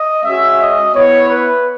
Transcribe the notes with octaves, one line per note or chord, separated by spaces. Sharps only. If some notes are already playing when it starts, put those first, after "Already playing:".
Already playing: D#5
G#3 C#4 F#4 E5
D#5
B3 E4 C#5
B4